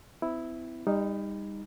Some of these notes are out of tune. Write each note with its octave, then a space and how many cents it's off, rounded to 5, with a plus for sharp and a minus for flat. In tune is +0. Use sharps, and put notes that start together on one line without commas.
C4 -45 E4 +0
G3 +30 D#4 +0